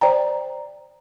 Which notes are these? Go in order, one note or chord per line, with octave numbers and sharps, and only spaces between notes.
C5 D5 G5 A#5